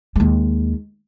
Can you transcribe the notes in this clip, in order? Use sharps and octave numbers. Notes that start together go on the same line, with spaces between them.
D#2 G#3